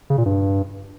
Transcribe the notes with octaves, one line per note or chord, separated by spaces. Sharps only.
C#3
A#2
G2